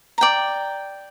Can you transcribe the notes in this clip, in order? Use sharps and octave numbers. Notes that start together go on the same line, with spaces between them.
D5 G5 A#5